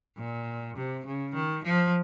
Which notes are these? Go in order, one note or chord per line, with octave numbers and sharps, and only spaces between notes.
A#2
C3
C#3
D#3
F3